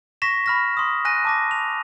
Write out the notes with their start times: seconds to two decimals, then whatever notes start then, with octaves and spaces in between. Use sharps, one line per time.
0.22 C#6 A#6 B6 E7
0.46 B5 F6 A#6
0.77 C6 D#6
1.05 G#5 F#6 A#6 D#7
1.25 A5 D6 A#6
1.51 F7